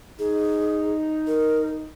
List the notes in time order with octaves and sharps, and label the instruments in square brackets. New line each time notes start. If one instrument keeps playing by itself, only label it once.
[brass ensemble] D#4 [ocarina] G#4
[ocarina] A#4